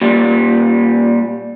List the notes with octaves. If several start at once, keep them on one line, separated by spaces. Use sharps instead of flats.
A#2 G3